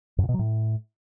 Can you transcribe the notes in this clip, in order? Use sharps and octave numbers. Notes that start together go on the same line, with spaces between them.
F#2
A#2
B2
F#3
A2